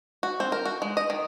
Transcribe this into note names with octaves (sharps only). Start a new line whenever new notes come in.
F#4
C4
A#4
F#4
G#3
D#5
D#3